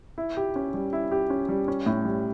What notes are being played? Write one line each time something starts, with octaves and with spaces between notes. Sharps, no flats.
E4
G4
C#4
G3
E4
G4
C#4
G3
C#4
A2
G3